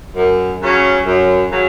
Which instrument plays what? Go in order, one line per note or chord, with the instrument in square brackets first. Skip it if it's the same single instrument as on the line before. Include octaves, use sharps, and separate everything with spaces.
[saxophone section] F#2
C#3 F#3 C#4
F#2
C#3 F#3